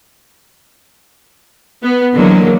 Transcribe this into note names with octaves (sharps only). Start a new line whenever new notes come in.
B3
D3 E3 F#3 G#3 A#3